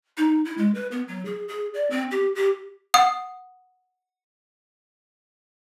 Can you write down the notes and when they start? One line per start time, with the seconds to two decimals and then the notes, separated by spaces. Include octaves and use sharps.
0.17 D#4
0.45 E4
0.58 G#3
0.75 B4
0.91 B3
1.08 F#3
1.25 G#4
1.48 G#4
1.74 D5
1.90 C4
2.11 G4
2.35 G4
2.94 F#5 D#6